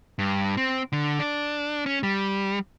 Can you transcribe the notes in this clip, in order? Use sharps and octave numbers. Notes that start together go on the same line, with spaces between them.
G2
C4
D3
D4
C#4
G3